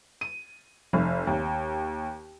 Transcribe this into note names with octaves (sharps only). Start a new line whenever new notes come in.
D#7
F1
D#2